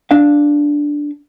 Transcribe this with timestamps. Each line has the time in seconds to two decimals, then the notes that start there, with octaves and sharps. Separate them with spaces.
0.11 D4 F5